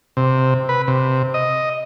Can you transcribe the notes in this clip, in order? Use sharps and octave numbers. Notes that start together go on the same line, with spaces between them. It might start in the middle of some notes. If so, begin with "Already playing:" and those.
C3
B4
C3
D#5